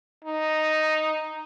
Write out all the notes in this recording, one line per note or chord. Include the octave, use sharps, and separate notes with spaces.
D#4